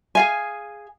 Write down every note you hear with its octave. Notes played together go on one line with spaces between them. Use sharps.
G#4 F5 G#5